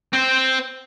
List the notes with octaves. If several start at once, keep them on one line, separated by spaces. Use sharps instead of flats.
C4 C5